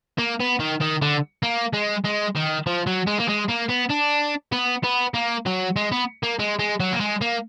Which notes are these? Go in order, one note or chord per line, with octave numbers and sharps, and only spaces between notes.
A#3
B3
D#3
D#3
D3
A#3
G#3
G#3
D#3
F3
F#3
G#3
A#3
G#3
A#3
B3
D4
B3
B3
A#3
F#3
G#3
B3
A#3
G#3
G#3
F#3
A#3
G#3
A#3